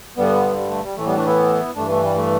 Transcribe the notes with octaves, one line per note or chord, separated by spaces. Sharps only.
G2 D3 G3 B3
G3
A3
G3
A2 E3 A3
G3 B3
A3 D4
B3 E4
G2 E3 A3 D4
A3
G3
A3